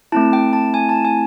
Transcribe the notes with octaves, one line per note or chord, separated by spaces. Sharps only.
A3 C4 E4 A5
G5
A5
G#5
A5
G#5